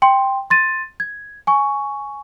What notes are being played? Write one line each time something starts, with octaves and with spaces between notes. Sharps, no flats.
G5 C6
C6 A6 D#7
G#6
G#5 C#6